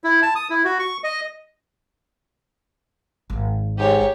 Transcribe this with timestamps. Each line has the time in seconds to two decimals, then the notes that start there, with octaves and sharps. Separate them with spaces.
0.04 E4
0.22 A5
0.35 D#6
0.50 E4
0.65 F#4
0.79 C#6
1.04 D#5
3.30 G#1
3.78 G#2 G4 C#5